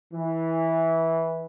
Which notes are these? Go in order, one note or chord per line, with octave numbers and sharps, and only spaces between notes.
E3